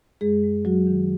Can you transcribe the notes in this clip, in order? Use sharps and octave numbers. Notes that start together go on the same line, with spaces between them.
F#2 G#3 G#4
G#3
F#2 F#3 F#4
D#3